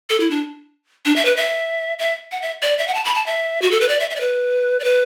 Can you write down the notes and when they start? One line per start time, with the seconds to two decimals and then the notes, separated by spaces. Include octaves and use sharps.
0.10 A4
0.20 E4
0.31 D4
1.05 D4
1.16 E5
1.25 B4
1.37 E5
1.99 E5
2.32 F#5
2.42 E5
2.62 D5
2.78 E5
2.88 F#5
2.94 A5
3.05 B5
3.15 A5
3.26 E5
3.62 F#4
3.71 A4
3.81 B4
3.88 D5
4.00 E5
4.10 E5
4.16 D5
4.20 B4
4.80 D5
4.84 B4